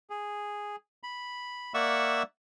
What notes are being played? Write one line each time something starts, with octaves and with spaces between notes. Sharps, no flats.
G#4
B5
A#3 D5 E5 F#5 C#6 E6